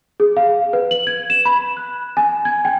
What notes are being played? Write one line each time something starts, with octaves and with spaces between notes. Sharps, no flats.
G#4
F5
B4
F#7
G#6
E7
B5
F#6
G#5
G#6
G5